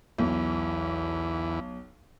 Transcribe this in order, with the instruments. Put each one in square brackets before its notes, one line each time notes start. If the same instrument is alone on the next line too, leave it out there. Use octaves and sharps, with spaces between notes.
[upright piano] B1 [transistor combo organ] E2